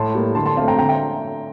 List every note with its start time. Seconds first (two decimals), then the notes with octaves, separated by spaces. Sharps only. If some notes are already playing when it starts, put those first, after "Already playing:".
Already playing: A2 A5 C6
0.15 G3 A#3
0.35 D3 A5 C6
0.46 A5 C6
0.57 A3 C4 F5 A5
0.68 G5 A#5
0.78 D3 G5 A#5
0.89 E5 G5